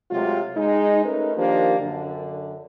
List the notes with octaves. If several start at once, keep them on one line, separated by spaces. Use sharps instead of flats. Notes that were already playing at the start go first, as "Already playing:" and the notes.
C3 F#3 G#3 A3 F4
G#3 D#4
A3 C#4 D#4 A#4 B4
D#3 F3 A#3 D4 G4
F#2 D3